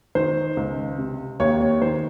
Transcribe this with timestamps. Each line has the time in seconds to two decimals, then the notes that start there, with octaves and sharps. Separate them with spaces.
0.15 D#3 C5
0.57 C#2
0.98 C3
1.40 D#2 C#5
1.61 C#5
1.82 D#3 C5